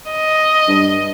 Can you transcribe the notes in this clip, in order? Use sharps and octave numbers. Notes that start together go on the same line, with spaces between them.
D#5
G2